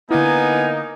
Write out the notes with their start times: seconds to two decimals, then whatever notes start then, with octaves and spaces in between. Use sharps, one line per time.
0.11 D3 A#3 B3 D#4 E4 G#5